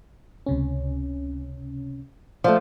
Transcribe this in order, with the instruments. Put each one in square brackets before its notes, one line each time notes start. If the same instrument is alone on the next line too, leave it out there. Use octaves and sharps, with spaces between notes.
[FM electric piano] C#2 C3 C#4
[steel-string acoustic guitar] F3 A3 [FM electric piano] D5